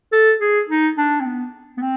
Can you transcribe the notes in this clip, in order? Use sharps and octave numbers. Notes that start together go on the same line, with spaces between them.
A4
G#4
D#4
D4
C4
B3
B3
C4